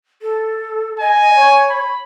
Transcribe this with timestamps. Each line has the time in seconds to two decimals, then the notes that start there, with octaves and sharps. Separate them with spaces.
0.22 A4
0.99 D#5 G#5
1.35 C#5
1.70 B5